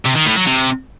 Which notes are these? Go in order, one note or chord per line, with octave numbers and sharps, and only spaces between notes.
C3
D#3
A2
F#3
C3